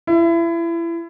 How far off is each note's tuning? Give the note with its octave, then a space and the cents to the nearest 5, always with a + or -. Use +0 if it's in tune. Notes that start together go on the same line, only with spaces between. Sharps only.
E4 +30